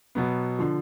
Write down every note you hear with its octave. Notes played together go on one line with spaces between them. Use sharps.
B2 F#3 B3
D3 F3